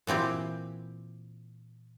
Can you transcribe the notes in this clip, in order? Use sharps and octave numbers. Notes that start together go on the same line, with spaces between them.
A#2 E3 C4 G4